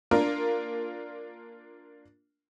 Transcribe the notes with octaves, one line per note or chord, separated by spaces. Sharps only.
A#3 D4 F4 A#4